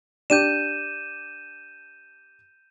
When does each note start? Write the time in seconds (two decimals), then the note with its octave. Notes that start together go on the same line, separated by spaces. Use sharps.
0.30 D4 G4 G6 D#7 E7